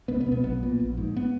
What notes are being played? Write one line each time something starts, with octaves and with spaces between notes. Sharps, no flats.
C#2 B3
B3
B2
B3
B1 B3
A#2
A#1
G#2
B3